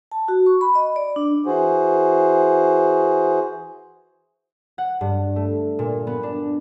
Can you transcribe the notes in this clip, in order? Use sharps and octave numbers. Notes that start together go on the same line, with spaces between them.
A5
F#4
C#6
B5
D#5
D5
D4
E3 F#4 G#4 C5
F#5
G2
A3
A#2
B3
D4